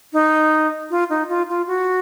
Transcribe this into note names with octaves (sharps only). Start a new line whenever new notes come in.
D#4
F4
D#4
F4
F4
F#4